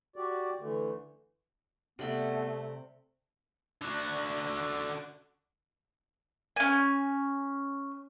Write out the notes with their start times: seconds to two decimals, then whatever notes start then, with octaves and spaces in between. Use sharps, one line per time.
0.16 F#4 G4 D5
0.60 D3 E3 A3
1.99 C3 G3 A3 B3 B5
3.81 D3 F#4
6.56 C#4 G#5